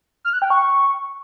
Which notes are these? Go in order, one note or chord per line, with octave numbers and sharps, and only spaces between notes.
F6
F#6
G5
C#6